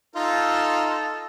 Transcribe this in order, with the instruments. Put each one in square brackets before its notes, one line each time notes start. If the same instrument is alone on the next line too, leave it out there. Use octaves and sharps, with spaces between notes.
[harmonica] D#4 F4 [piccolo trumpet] A4